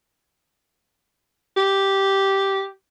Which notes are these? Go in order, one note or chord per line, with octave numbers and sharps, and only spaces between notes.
G4